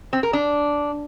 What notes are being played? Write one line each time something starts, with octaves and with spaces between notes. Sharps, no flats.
C4
A#4
D4